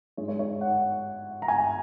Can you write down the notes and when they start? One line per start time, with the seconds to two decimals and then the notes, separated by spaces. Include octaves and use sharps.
0.17 G#2 G#3 C#5
0.28 C#5
0.39 C#5
0.61 F#5
1.42 A#5
1.48 G#5